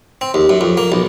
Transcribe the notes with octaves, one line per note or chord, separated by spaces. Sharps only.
C4
D#2
F#2
F2
A#3
B1